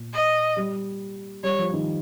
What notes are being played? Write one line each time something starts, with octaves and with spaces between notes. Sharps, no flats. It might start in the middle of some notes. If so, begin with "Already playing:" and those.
Already playing: A#2
D#5
G3
G3 C#5
F3
D#3